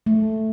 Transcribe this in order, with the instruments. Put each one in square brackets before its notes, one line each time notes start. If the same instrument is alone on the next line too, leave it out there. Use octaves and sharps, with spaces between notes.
[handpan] A3